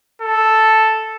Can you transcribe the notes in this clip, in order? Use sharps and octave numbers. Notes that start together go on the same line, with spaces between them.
A4